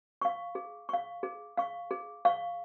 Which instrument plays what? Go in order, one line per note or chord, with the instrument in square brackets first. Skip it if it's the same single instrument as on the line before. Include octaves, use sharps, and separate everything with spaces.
[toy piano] F5 C#6
G#4
F5 C#6
G#4
F5 C#6
G#4
F5 C#6